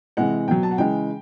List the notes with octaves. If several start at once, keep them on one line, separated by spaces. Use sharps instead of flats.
C3 E3 G#3 F#5
B2 F#3 G5
A5
F#5
C#3 E3 G#3 G5